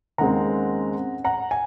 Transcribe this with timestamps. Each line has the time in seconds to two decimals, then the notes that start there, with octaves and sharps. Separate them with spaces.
0.18 D#2 C#3 G#3 C4 F#5 A#5
1.25 F#5 A#5
1.51 G#5